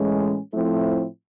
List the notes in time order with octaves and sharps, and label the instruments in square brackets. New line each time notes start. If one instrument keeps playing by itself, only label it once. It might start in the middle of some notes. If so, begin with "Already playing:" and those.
Already playing: [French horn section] A2 E3 G#3 C#4
A2 F3 A3 C4 E4